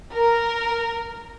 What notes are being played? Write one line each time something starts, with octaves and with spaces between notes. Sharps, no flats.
A#4